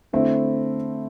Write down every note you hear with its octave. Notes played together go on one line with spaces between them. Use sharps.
D3 A3 C4 E4